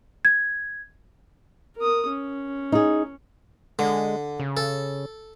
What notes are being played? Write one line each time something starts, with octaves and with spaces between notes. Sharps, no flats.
G#6
A#4 D#6
C#4
D#4 G#4
D3 G#3
C#3
A4